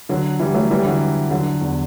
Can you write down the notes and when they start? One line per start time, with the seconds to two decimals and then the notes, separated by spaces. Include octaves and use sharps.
0.09 D3 F#3
0.40 E3 G3
0.54 F#3 A3
0.71 E3 G3
0.85 D3 F#3
1.31 D3 F#3
1.61 E2